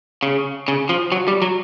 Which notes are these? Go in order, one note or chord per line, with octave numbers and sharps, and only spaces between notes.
C#3
C#3
F3
F#3
G3
F#3